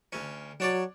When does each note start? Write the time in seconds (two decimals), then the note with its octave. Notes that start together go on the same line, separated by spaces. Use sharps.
0.13 D2 C#4
0.60 F#3 D4 C#5 D5